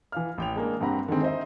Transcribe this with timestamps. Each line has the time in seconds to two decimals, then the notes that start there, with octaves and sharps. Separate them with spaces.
0.12 E3 F5 F6
0.38 A1 G5 F7
0.56 G#3 A#3 D4
0.81 G2 C4 G4 F#5 A#5 B5
1.08 D3 D#3 G#3 C4
1.21 D#4 C5 D#5 E5